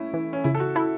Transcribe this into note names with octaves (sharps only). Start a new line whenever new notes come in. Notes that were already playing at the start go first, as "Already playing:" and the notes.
Already playing: A3 C#4 E4
E3
C#4
C#3 E4
A4
F#4
E4 A4